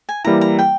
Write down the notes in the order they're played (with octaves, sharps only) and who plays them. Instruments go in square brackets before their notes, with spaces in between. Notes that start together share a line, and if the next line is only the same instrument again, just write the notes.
[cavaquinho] G#5
[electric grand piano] E3 G3 A#3 E4 [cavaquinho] A#5
[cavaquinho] A#5
G5